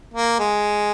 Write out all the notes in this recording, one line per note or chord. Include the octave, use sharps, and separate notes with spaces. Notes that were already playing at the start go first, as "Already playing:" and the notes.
A#3
G#3